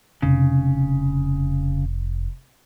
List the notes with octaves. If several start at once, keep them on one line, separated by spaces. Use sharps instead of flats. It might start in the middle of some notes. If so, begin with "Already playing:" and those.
F1 C#3